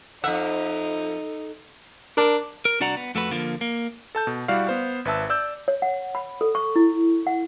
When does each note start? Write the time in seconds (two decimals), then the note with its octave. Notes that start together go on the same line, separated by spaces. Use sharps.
0.24 F2 D#4 A4 E5 F#5
2.17 D4 A#4
2.65 A#4
2.80 C2 D4 F#4 D5 F#5 A#5
2.97 B3
3.15 F2 A3 F#4 B4
3.31 D3 F3 A#3
3.61 A#3
4.15 A4 A5 G6
4.27 B2
4.48 G3 E4 F#4 D5 F5
4.67 B3 C5 F5
5.05 G#1 B4 E5 A5 E6
5.30 D5 E6 G6
5.68 C#5
5.82 F#5
6.15 B5
6.41 A4
6.55 C#6
6.76 E4
7.27 F#5